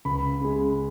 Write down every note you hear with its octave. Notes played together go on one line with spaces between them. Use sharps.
C#2 B5
C#3 G#3